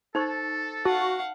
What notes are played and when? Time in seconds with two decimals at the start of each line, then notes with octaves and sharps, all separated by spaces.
0.15 D#4 A4 C5 C#6
0.85 F#4 F5 F#5 A5